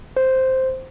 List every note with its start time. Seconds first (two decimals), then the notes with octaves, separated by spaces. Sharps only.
0.17 C5